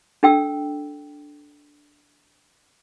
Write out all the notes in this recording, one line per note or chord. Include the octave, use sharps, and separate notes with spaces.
D4 A4 G5 E6